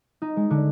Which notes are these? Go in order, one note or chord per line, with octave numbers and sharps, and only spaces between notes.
D#4
G#3
D3